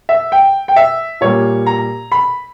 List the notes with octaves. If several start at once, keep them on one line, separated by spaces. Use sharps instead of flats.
E5
G5
G5
E5
A#2 G3 A#3 C#5
A#5
B5